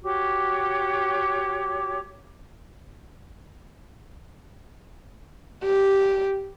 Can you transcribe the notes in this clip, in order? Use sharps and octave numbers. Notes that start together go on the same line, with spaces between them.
F#4 G4 C#5 D6
G4